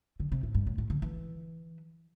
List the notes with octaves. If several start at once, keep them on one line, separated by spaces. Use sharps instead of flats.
D3
C3
A2
G2
A2
A2
D3
E3